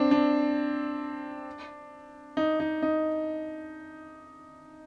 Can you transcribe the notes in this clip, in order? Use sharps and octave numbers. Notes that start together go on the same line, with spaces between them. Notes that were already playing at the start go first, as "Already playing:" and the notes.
Already playing: C4 D4
D4
D#4
D#4
D#4